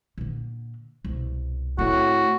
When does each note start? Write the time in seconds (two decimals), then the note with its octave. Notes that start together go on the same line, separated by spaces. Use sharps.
0.18 A#2 D3
1.05 C2 B2
1.79 A2 C4 C#4 F#4